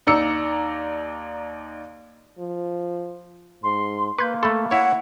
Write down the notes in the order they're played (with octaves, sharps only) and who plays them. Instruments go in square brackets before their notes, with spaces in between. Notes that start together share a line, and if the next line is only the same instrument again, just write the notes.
[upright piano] D#2 D#4 D5 A#5 E6 C#7
[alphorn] F3
[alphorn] G#2 [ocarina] C6
[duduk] A#3 [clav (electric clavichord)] B4 [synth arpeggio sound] C6 G6
[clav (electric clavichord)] A3 A4 [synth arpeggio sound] B5
[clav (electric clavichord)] E4 C#5 [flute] F#5